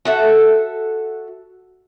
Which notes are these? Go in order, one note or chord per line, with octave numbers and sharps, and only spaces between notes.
F#4 A4 E5